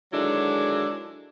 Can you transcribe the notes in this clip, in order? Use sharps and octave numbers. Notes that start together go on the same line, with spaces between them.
D3 D#3 F#3 G#3 D4 E4